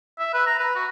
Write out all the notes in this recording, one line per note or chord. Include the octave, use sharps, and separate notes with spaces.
E5
B4
A#5
B4
F#4